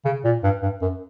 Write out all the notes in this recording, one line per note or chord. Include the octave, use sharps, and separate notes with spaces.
C#3
A#2
G2
G2
F#2